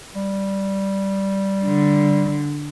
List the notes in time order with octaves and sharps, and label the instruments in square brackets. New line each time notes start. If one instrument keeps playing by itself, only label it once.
[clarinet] G3
[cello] D3